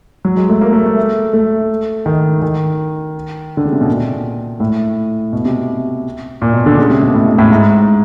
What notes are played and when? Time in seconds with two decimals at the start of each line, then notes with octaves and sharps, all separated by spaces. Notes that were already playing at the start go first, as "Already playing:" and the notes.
0.25 F#3
0.37 G#3
0.49 A3
0.61 A#3
0.73 A3
0.86 A3
1.33 A3
2.06 D#3
2.42 D#3
3.57 D3
3.65 C#3
3.73 C3
3.81 B2
3.88 A#2
4.60 A2
5.33 B2
5.45 C3
6.42 A#2
6.54 B2
6.66 D3
6.78 C#3
6.90 C3
7.03 B2
7.14 A2
7.27 G#2
7.38 A2
7.51 G#2